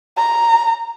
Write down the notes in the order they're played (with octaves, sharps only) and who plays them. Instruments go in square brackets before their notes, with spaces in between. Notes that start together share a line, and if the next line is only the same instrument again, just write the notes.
[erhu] A#5